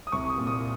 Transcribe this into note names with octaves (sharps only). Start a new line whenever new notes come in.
D#6
C2 C#6
D#6
A#2
D#6